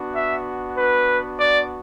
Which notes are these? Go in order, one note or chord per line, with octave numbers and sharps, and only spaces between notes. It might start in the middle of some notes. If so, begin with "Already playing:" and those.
Already playing: B3 D4 F#4
E5
B4
D5